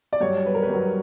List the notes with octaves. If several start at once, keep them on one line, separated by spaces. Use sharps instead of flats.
D5
G2 F#3 C#5
B4
A#4
B4
G2 F#3